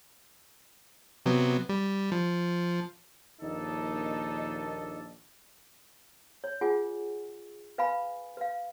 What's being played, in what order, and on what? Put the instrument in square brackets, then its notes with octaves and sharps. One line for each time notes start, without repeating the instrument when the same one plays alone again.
[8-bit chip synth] C3 F#3 B3
G3
F3
[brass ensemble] A#1 D#2 D4 D#4 A4 D#5
[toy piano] C#5
F4 G#4 F#5 G#5
B4 F5 G#5 B5
B4 F5